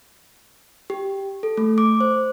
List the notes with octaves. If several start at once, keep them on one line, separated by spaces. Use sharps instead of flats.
G4
A4
A3
D6
C5